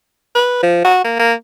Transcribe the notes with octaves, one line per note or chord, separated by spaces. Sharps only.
B4
F3
F#4
A#3
A#3